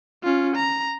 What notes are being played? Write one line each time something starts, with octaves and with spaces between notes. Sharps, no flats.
C#4 F4
A#5